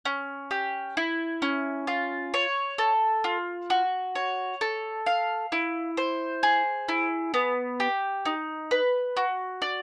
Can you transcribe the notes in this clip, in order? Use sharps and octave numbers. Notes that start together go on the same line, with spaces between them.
C#4
G4
E4
C#4
F4
C#5
A4
F4
F#4
C#5
A4
F5
E4
C5
G#4
E4
B3
G4
D#4
B4
F#4
D5